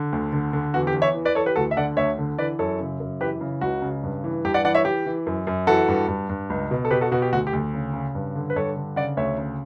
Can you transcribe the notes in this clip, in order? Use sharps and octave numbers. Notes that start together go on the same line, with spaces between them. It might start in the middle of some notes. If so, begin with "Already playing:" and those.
Already playing: D3
D2
D3
D3
E2 F#4
G4
E2
C#5 E5
E3
B4 D5
E3 A4 C#5
G4 B4
D2 F#4 A4
E5
D3 D5 F#5
D2 C#5 E5
D3
E3 B4 D5
F#2 A4 C#5
C#3
F#2
E3 G4 B4
C#3
C#2 F#4
C#3
G2
E3
G2 G4
D5 F#5
E3 D5 F#5
C#5 E5
E3 G4
E3
F#2
F#2
E3 F#4 A4
G2
G2
G2
C#2
B2
A4
B2 G4 B4
F#4 A4
B2 F#4
G4
D2 F#4
G4
D2
C#3
C#3
G2
D3
B4
G2 A4 C#5
D3
C#3 D5 F#5
D2 C#5 E5
C#3